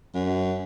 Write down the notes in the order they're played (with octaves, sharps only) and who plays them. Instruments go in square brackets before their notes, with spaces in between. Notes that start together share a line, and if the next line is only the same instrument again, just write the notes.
[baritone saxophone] F#2